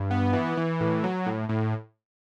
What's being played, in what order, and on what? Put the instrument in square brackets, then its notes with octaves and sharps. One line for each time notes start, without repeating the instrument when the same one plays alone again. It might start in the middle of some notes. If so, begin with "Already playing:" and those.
Already playing: [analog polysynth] G2
B3
E3
E3
A2
F#3
A2
A2